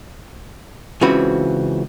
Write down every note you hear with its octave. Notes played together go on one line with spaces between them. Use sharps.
C#2 C#3 E3 C4 F#4 B5